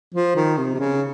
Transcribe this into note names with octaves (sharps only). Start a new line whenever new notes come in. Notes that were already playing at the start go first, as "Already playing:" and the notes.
F3
D#3
C3
C3
C#3